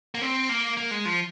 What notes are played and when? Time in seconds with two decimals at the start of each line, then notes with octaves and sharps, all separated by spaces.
0.15 A#3
0.21 C4
0.49 A#3
0.77 A#3
0.91 G#3
1.05 F3